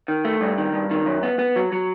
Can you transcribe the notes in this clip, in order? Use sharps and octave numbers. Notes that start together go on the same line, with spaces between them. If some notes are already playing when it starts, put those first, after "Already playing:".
D#3
A3
G2
D#3
G2
D#3
F#2
B3
B3
F#3
F#3